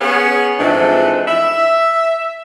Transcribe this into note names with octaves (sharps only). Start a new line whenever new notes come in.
B3 C#4 G#4
G#2 E3 F3 A3 C4 D4
E5